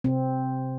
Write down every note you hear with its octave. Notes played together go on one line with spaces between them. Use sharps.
C3 C4